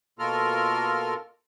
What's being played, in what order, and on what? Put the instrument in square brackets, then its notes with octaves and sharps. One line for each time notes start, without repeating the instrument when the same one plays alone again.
[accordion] B2 A#3 F4 A4 A#4 F6